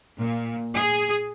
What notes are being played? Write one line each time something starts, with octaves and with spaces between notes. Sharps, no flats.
A#2
G#4